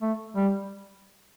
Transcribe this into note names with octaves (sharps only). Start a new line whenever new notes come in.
A3
G3